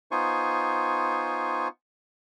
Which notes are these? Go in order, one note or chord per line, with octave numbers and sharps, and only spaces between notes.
B3 D#4 F4 C5 G#5 C#6